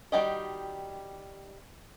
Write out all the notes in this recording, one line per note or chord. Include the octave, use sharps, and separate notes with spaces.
D#3 G3 F#4 G4 D#5